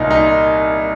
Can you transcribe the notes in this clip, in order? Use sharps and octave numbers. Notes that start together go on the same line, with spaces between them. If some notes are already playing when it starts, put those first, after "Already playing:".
Already playing: C2 A#2 D#4
D#4